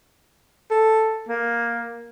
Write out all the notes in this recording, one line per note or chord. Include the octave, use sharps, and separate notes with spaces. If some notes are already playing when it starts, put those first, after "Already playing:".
A4
A#3